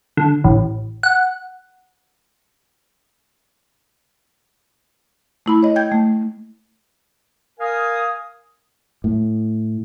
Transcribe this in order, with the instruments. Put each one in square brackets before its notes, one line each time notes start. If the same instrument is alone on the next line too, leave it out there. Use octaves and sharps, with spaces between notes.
[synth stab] D3
A1
F#5
[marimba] A3 E4 B5
C#5 D#5
G5 G6 G#6
A3
[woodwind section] A#4 F5 G#5 D#6
[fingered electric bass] A2